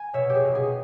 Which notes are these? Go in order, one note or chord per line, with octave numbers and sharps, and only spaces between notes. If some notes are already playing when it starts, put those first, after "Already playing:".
Already playing: G#5
B2 C#5 E5
G4
G#4
B2
G#4